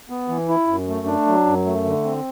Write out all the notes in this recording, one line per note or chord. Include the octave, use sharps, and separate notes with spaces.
B3
E3
E4
F#2
A3
D4
F#3
F#2
A3
D3
C4